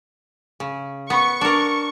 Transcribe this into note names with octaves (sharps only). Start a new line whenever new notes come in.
C#3
B3 C#6
D4 A#4